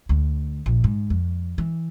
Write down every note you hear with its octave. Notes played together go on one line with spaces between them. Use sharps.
D2
A#1
G#2
F2
E3